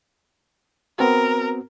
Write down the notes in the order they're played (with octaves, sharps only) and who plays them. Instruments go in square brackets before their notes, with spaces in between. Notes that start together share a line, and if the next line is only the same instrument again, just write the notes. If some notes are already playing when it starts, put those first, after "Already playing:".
[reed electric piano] B3 C4 F#4 [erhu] A#4